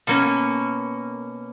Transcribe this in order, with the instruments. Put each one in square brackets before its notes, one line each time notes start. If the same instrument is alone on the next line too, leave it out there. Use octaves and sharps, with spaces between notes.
[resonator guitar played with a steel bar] B2 A#3 C#4